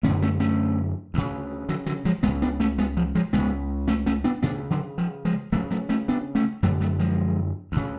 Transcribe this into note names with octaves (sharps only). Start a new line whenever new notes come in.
D3 A3 C#4
F#2
A3 C#4
A3 C#4
D2 C#3
D3 F#3
D3 F#3
F3 G#3
C#2 G#3 B3
C#3
B3 D4
A3 C#4
G#3 B3
F3
F3 G#3
C#2 C#3 G#3 B3
A3 C#4
A3 C#4
B3 D4
D2 C#3 B3 D4
D3 F#3
F3
F3 G#3
D2 C#3 F#3 A3
F#3 A3
A3 C#4
B3 D4
A3 C#4
F#2 D3 F#3 A3
F#3 A3
F3 G#3
D2 C#3